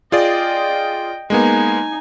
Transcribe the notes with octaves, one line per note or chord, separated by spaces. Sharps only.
F4 G#4 D5 D#5 G5
G#3 A#3 B3 D#4 G#5